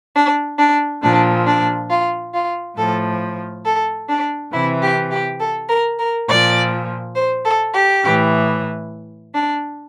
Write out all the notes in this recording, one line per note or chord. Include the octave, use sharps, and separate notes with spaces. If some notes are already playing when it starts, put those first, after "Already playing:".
D4
D4
A#2 F3 D4
D4
F4
F4
A2 F3 A4
A4
D4
C3 E3 E4
G4
G4
A4
A#4
A#4
A#2 F3 D5
C5
A4
G4
A2 E3
D4